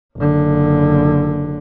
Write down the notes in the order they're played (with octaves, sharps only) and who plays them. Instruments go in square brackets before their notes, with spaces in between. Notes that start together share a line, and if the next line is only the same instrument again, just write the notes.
[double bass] F#1 D3